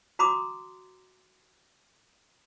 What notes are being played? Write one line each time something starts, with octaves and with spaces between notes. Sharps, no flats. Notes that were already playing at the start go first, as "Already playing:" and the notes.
F#4 A#5 C6 D6 D#6